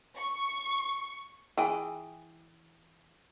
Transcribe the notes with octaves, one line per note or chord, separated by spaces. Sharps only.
C#6
E3 G#4 G5